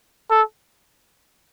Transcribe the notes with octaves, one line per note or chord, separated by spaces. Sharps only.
A4